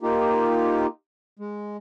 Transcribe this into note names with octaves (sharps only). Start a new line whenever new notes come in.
A#3 D#4 F4 G4
G#3